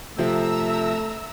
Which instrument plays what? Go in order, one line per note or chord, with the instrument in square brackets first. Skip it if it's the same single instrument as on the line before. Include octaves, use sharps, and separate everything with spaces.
[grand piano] C3 F3 C4 [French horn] A3 [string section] E5 A#5 E6